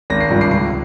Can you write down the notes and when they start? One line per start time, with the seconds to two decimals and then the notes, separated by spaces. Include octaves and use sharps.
0.10 G#1 A#6
0.20 C7
0.30 G2 F3
0.41 C7
0.51 C#2 C7